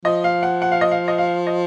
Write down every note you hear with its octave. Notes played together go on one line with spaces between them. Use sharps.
F3 D#5
F5
F#5
F#5
F5
D#5
F5
D#5
F5
D#5